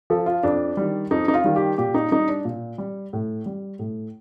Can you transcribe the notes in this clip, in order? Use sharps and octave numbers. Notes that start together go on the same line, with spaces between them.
F3 A4
F4
F2 D4
D#3 G3
F2 D#4
D#4
F4
D#3 G3
G4
A#2 G4
D#4
G3 D#4
D4
A#2
G3
A2
G3
A2